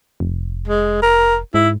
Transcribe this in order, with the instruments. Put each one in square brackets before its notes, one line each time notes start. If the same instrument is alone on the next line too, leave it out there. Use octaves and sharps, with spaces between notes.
[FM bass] F1
[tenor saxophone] G#3
A#4
[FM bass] G#2 [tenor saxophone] E4